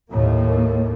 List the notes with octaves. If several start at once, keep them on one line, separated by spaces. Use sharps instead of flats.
D#2 A2 A#3